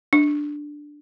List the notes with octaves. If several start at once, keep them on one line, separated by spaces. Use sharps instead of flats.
D4